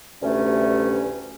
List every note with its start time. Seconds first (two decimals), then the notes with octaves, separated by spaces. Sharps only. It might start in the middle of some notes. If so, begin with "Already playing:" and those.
0.22 D2 G2 C3 E3 A3 C#4